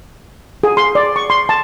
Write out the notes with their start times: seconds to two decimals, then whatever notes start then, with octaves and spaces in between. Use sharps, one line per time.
0.63 G#4
0.77 C6
0.95 D5
1.16 C#6
1.30 C6
1.49 A5